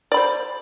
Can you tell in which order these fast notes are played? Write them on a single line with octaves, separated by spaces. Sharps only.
D5 B5 C5